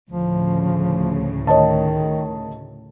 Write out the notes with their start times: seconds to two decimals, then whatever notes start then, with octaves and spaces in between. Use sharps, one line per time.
0.10 D2 A2 C#3 F3
1.47 D#3 C#5 D#5 A5